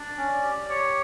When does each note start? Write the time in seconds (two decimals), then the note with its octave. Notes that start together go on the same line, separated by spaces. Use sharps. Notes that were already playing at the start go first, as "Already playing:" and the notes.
Already playing: D4 D5
0.17 C#4
0.43 G4
0.69 G4 C#5